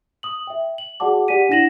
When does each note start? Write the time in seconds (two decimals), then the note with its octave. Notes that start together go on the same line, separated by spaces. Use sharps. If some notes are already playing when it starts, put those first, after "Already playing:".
0.23 D#6 F#7
0.47 E5 G5
0.78 F#7
1.00 F#4 G#4 D5 F#5 A5 D6
1.28 G4 D5 F#5 G#5 B6 D#7
1.49 D4 E4 F#5 A#6 E7 F#7